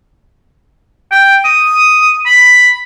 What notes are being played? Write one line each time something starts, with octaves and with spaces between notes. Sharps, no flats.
G5
D#6
B5